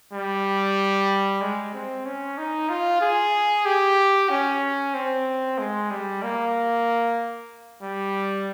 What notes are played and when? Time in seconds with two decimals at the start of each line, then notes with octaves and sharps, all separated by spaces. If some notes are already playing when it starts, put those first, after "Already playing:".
0.13 G3
1.42 G#3
1.74 C4
2.06 C#4
2.38 D#4
2.69 F4
3.02 G#4
3.66 G4
4.30 C#4
4.94 C4
5.59 G#3
5.91 G3
6.23 A#3
7.83 G3